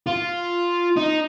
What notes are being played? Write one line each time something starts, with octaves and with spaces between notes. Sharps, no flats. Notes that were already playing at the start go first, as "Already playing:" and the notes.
F4
D#4